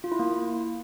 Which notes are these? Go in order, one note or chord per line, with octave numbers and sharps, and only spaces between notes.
F4
E4
A#3